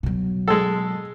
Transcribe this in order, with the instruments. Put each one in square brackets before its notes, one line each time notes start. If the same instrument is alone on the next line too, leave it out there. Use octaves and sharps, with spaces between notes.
[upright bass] B2 F#3
[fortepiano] G#3 A4